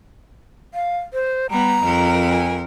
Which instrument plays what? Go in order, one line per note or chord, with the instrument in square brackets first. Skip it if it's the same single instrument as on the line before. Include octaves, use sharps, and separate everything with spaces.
[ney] F5
C5
[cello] G3 B3 [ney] A#5
[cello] F2 A#4
[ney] G#5